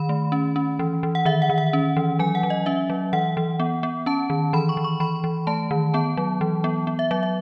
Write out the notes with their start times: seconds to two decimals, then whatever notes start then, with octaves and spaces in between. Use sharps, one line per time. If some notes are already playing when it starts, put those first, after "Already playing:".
Already playing: D#3 B5
0.09 A3
0.32 C#4
0.56 C#4
0.79 E3
1.03 E3
1.15 F#5
1.25 D#3 E5
1.42 F#5
1.50 D#3
1.58 F#5
1.73 C#4
1.97 E3
2.19 F#3 G#5
2.35 F#5
2.43 F#3
2.50 D#5
2.66 C#4 E5
2.90 F#3
3.13 E3 F#5
3.37 E3
3.60 B3
3.83 B3
4.06 C#4 A5
4.30 D#3
4.53 E3 B5
4.69 C#6
4.77 E3
4.84 C#6
5.00 E3 B5
5.24 E3
5.47 A3 A5
5.71 D#3
5.94 B3 A5
6.17 F#3
6.41 E3
6.64 B3
6.87 B3
6.99 E5
7.11 F#3 E5
7.23 E5